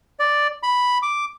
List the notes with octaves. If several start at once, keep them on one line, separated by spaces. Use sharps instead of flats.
D5
B5
D6